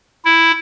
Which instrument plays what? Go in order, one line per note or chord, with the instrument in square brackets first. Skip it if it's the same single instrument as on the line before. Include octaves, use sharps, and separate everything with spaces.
[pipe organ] E4